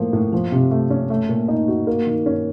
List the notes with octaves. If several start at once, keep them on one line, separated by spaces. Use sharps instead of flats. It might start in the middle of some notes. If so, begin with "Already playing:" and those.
Already playing: A2 F3 A#3
A2
F3
C3
A3
C#4
A3
A#2
D#4
F#4
A#3
D#3
C#4